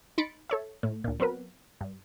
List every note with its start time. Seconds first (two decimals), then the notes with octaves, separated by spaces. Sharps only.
0.18 D#4 B5 C6 A6 C#7 D7
0.50 A4 C#5 E5
0.83 A2
1.04 D2 A#2
1.20 F#3 B3 C4 A#4 B4
1.81 G2